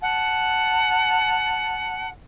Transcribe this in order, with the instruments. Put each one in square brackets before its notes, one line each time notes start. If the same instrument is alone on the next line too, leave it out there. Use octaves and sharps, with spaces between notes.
[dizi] F#5 [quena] A5